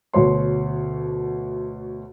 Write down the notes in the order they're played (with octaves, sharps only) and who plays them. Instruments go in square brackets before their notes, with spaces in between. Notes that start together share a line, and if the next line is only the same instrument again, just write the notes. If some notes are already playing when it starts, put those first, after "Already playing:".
[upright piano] D2 B2 C#5 C6